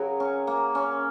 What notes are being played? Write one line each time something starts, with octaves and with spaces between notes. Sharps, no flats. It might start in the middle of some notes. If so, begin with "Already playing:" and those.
Already playing: C#3 F#3 G#4 A#4
C#4
A#3
C#4